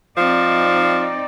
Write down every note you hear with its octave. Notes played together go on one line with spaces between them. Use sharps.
F3 C4 D#4 D5